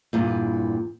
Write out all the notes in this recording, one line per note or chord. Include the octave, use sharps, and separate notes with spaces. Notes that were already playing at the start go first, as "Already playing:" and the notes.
E2 G2 A#2